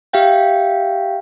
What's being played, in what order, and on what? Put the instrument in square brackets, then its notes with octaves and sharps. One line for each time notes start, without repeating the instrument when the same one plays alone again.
[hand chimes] G4 E5 F5 G5